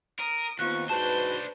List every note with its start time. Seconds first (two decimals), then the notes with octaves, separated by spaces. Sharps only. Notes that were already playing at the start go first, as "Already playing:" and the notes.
0.19 A#4 D#6
0.59 D#2 B3 C4 F4 C#6 F#6
0.90 G#2 D4 F#4 B4 C5 A5 G6